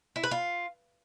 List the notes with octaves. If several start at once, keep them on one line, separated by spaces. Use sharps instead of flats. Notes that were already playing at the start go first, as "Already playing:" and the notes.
E4
B4
F4